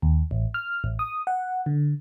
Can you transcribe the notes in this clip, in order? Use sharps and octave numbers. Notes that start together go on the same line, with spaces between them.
D#2
A1
F6
A1
D#6
F#5
D3